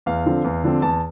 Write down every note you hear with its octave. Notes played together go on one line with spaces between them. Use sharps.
E2 F5
D3 F3 C4
E2
D3 F3 C4
E2 A5